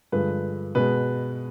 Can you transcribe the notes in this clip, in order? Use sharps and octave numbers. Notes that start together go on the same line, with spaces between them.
G2 D3 F3 G#3 B4
B2 G#3 B4